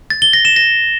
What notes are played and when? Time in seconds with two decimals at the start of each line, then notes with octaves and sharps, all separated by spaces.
0.10 A6
0.22 G7
0.33 A#6
0.45 E7
0.56 A#6